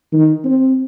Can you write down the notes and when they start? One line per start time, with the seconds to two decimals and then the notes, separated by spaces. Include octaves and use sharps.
0.12 D#3
0.44 C4